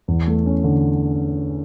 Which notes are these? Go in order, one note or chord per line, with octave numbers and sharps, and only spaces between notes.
E2
A3
C#4
D3